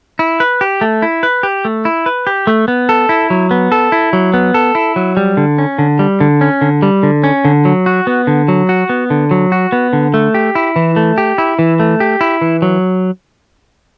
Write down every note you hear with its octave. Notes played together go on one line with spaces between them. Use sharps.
E4
B4
G4
A3
E4
B4
G4
A3
E4
B4
G4
A3
B3
A4
E4
F#3
B3
A4
E4
F#3
B3
A4
E4
F#3
G3
D3
C#4
D3
G3
D3
C#4
D3
G3
D3
C#4
D3
F#3
F#4
B3
D3
F#3
F#4
B3
D3
F#3
F#4
B3
D3
A3
G4
E4
E3
A3
G4
E4
E3
A3
G4
E4
E3
F#3